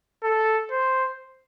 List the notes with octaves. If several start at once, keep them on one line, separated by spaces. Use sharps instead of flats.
A4
C5